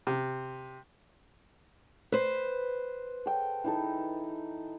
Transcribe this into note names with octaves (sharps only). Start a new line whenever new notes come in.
C3
B4 C5
A4 G5
E3 D#4 A4